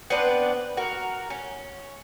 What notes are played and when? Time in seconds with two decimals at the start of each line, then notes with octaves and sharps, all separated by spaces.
0.10 B3 C4 D4 B4
0.77 F#4 A#4
1.30 C#4